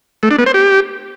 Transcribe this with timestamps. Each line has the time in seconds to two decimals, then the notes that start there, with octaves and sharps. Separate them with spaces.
0.23 A3
0.31 D4
0.39 B3
0.46 C5
0.54 G4